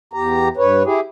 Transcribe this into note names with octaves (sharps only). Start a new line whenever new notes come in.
E2 G4 A#5
G2 B4 C#5
E4 G4 G#4